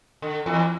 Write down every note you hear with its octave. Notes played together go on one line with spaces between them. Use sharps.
D3
E2 E3